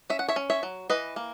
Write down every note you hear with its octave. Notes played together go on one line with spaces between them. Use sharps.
C#4 E5
F#5
C#5 E5
C#4
C#5 E5
F#3
E3 B4 D#5
A#3